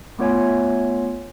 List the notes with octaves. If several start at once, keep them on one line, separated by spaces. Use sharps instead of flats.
A3 B3 F4 C#5 E5 G#5